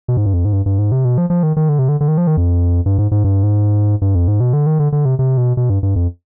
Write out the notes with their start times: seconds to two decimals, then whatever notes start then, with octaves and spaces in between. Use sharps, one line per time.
0.08 B2
0.17 G#2
0.25 G2
0.33 F2
0.45 G#2
0.53 G2
0.66 G2
0.79 G#2
0.92 C3
1.05 B2
1.18 F3
1.30 F3
1.43 D#3
1.57 D#3
1.69 D3
1.79 C3
1.89 D3
2.01 D3
2.08 D#3
2.18 F3
2.27 D#3
2.37 F2
2.86 G2
2.98 G#2
3.11 G#2
3.24 G2
3.43 G#2
4.02 G2
4.15 F2
4.28 G#2
4.40 B2
4.53 D3
4.67 D#3
4.79 D3
4.92 D3
5.05 C3
5.19 C3
5.38 B2
5.57 B2
5.70 G2
5.83 G2
5.96 F2